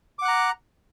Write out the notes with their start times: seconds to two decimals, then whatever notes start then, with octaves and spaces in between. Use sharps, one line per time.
0.19 D6
0.22 F#5
0.25 F#6
0.28 A#5